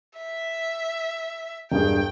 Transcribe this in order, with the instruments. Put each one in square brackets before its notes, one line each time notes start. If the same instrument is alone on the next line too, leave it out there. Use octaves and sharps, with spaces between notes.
[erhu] E5
[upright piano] E1 G2 G#4 [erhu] G5